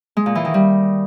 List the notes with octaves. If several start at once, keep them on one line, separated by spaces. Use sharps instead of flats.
G#3
A#2
E3
D#3
G3